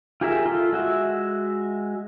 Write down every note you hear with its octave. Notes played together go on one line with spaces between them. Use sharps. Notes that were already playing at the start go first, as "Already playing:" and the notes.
F4 G4 G#4 A#4 E5
F4 A4
G#3 F#4 E5